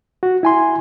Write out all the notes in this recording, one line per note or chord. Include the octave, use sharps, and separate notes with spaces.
F#4
E4 G#5 C6